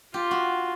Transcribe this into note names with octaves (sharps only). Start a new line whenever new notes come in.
F4 G4
F#4